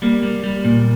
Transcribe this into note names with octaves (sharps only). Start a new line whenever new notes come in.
G3 A#3
G3
G3
A#2